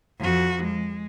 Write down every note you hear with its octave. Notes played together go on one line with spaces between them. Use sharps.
F2 F#4
G#3